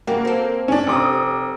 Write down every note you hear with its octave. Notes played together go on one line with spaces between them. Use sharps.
C#3 A#3 F#4 G4
C4 A4
C#4 D4
F1 D6 D#6